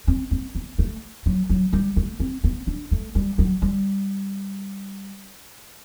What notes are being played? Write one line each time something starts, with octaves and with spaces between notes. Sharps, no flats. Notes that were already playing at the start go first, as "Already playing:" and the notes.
C4
C4
B3
A3
F#3
F#3
G3
A3
C4
B3
D4
A3
G3
F#3
G3